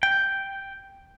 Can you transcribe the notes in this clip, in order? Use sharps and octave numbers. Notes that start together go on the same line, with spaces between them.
G5